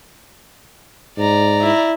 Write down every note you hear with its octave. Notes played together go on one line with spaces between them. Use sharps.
G#2 D5 A#5
E4